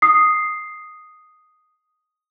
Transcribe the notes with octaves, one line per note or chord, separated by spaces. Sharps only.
D#6 C7